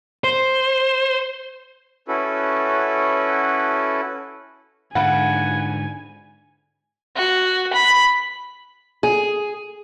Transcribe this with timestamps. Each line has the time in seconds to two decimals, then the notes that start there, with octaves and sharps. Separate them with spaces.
0.24 C5
2.08 C#4 E4 F#4 A4 B4
4.95 G#2 D3 B4 F5 F#5 G#5
7.15 F#4
7.73 B5
9.03 G#4